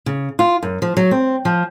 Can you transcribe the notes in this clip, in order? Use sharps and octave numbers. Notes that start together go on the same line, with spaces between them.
C#3
F4
F#2
F3
F#3
C4
F3